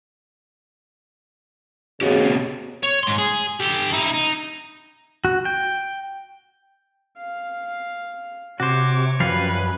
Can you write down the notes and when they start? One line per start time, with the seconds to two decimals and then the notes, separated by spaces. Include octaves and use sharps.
2.01 C#3 B3 F#4 G4
2.83 C#5
3.03 G#2 C6
3.18 G#4
3.60 G4 A4
3.92 D#4 E4
4.14 D#4
5.25 F#4
5.45 G5
7.18 F5
8.60 C3 F#4 C5 C#5 D6
9.20 F#2 F3 G3 B4 F5